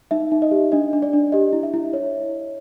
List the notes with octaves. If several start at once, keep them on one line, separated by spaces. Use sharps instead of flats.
D#4 E5
D#4
D#5
G4
D4 D#5
D4
D5
D4
G4 D#5
E4
E5
E4
C#5